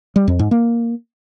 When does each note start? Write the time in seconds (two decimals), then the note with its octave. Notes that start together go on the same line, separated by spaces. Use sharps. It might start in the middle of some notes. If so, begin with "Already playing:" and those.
0.16 G3
0.28 F2
0.39 G#2
0.51 A#3